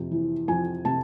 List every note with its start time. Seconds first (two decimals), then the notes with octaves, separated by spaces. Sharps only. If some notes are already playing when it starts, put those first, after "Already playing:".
Already playing: F2 C3
0.11 E3
0.48 F2 G#5
0.85 C3 A5